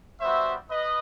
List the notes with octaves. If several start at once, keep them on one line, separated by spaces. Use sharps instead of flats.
G3 B3 F#4 C5 E5
B4 D#5